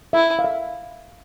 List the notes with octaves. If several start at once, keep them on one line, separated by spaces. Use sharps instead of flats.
E4 E5
F5
E5